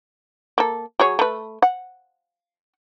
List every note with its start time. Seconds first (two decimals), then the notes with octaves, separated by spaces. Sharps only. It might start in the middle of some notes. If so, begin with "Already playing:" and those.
0.58 A#3 A4
1.00 F#3 G#4 C#5
1.19 A3 B4
1.62 F#5